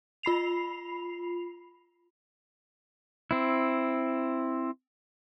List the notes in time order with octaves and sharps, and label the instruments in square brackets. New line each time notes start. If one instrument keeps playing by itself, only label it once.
[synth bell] F4 B5 C7 F7
[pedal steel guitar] C4 E4